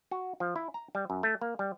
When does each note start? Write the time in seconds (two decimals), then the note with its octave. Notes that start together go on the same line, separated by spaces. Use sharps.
0.11 F#4
0.40 F3
0.56 E4
0.74 A#5
0.95 G3
1.10 F#2
1.23 A3
1.42 A#3
1.59 G3